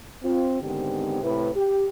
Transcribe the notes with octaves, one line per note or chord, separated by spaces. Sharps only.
C4 F4
G#2 D3 D#3 B3 C4 G4
A2 C3 E4 B4
G4